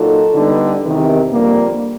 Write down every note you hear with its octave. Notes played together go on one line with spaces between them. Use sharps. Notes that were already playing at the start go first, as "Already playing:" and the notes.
Already playing: A#2 F#3 D#4 A4
D3 G3 B3 D#4
E2 C3 D#3
F2 D3 G3 A#3